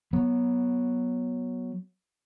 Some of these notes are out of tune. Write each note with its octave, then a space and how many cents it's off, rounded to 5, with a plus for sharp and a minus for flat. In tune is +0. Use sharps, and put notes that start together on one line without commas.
F#3 +0 B3 -20